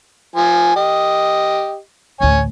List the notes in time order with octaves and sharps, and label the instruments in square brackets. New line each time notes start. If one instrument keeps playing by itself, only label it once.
[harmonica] F3 G#5
G4 D#5
[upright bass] A1 D2 [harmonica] C#5 G#5